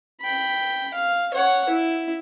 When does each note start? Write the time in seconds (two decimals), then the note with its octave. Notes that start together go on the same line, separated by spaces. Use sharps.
0.21 G5 B5
0.94 F5
1.34 C#5 F#5
1.69 E4